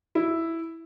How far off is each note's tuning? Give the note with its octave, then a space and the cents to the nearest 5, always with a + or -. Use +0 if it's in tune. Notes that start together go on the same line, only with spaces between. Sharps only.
E4 +0